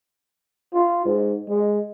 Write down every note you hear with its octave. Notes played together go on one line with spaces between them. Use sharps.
F4
G#2
G#3